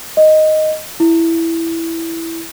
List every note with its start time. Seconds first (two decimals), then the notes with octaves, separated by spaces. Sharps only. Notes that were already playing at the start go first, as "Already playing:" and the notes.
0.17 D#5
1.00 E4